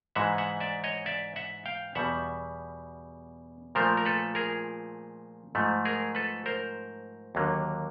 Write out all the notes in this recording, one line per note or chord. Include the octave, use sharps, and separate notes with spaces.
G#2 E3 G#3 E5 F#5
E5 F#5
D5 E5
C#5 D#5
D5 E5
E5 F#5
F5 G5
E2 B2 G3 E5 F#5
A#2 F3 A3 A#4 C5
A#4
A4 B4
G#4 A#4
G#2 F3 A3
G#4 A#4
A4 B4
A#4 C5
D#2 D3 F#3 A#3